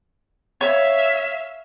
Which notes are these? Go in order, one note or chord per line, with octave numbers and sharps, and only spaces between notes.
C#5 E5 F5